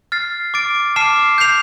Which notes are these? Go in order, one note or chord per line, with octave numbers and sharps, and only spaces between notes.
F6 A6 C7
D6 A6 D7
A5 D6 F6 C7 E7
G6 C7 F7